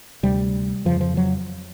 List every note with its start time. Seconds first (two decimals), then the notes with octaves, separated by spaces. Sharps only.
0.23 D2 C3 G3
0.85 F2 C#3 F3
1.01 F3
1.17 F#3